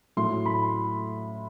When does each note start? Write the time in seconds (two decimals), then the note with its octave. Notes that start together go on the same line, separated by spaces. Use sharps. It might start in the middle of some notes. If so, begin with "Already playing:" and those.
0.17 A2 F#3 A3 C6
0.46 B5